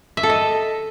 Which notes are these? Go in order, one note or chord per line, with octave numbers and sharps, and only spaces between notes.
E5
A4
D#5